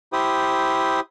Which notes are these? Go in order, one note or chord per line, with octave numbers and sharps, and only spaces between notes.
E4 G4 C5 D#6